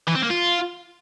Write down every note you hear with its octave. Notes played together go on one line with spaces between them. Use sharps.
E3
C4
A#3
F4